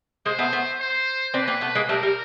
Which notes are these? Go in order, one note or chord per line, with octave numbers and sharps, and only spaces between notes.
G#3 A#3 C5
A3 B3
A3 B3
C5
C4 D4 B4
A#3 C4
A3 B3
G#3 A#3
G3 A3 A#4
G3